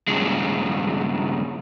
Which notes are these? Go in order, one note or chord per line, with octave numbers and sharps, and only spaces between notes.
G2 A#2 C#3 G#3